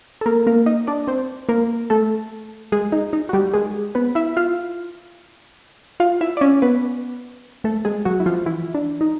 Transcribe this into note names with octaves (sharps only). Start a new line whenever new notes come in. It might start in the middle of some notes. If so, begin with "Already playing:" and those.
A4
A#3 A#4
A#3 A#4
D#4 D#5
D4 D5
C4 C5
A#3 A#4
A3 A4
G#3 G#4
D#4
D#4
F#4
G3 G4
G#3 G#4
B3 B4
E4 E5
F4 F5
F4 F5
E4 E5
D5
C#4 C#5
B3 B4
A3 A4
G#3 G#4
F#3 F#4
E4
F3 F4
E3 E4
D4
D#4